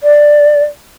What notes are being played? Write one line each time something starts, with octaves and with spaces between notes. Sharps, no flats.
D5